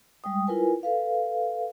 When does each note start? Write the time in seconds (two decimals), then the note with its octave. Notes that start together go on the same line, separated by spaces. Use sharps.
0.24 G3 G#3 G5 D#6
0.47 E4 F4 A#4 B4 G#5
0.83 A4 B4 F5